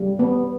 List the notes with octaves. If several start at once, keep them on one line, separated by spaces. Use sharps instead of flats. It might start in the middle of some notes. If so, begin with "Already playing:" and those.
Already playing: G3
B3